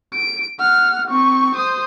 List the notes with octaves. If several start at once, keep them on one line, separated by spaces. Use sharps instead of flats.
D7
F#5 F6
C4 C#6
C5 D#6